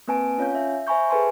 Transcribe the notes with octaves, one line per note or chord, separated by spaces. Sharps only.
A#3 C4 B4 G#5 A5 D7
C#4 F4 C#5 F5 G#5 G6
E5
C5 E5 G#5 B5 C#6 G6
G#4 A4 B4 G#5 A5 C6